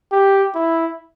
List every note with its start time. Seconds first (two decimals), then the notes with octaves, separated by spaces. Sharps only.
0.12 G4
0.55 E4